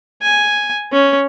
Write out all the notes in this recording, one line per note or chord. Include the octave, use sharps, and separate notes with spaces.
G#5
C#4